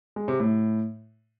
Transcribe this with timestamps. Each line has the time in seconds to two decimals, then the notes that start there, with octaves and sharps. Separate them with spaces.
0.16 G#3
0.28 C3
0.40 A2